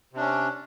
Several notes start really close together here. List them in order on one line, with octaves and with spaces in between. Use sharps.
C3 D4 C#4